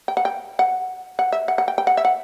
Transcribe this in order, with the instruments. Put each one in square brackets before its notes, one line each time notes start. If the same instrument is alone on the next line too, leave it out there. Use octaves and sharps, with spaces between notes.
[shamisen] G5
F#5
G5
F#5
F#5
E5
F#5
F#5
G5
G5
F#5
E5
F#5